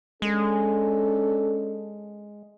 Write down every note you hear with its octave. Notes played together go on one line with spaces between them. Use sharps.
G#3 C#4 D4 A4